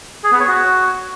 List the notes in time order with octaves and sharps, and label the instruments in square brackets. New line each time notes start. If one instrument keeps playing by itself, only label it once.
[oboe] G#4
B3
C#5
F#4